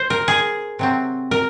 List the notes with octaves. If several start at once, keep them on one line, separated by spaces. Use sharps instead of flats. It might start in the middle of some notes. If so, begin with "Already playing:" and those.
Already playing: C5
A#4
G#4
C3 F#3 C4
A#4